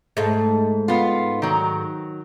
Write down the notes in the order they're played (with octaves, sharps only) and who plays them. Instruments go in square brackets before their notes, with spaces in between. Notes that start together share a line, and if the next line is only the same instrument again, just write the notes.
[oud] G#2 A3
[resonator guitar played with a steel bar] B3 F4
D#3 F#3